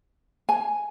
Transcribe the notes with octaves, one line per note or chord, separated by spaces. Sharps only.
G#5